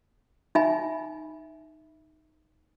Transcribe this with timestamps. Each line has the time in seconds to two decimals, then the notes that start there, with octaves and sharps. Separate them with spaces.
0.55 D#4 E5 G#5 B5